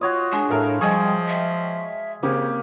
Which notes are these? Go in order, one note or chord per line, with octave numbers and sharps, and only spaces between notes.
F4 F#4 C#5 D#5
G#3 D4
A2 A4 A#4 E5 F5
F3 G3 G#4 D#5 G5 C#6
E5
C#3 A#3 C4 C#4 G4